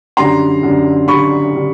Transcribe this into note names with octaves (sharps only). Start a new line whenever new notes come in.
F#2 D3 G3 A#5 C6
F#2 D3 G3
F#2 D3 G3 B5 C#6
D3 G3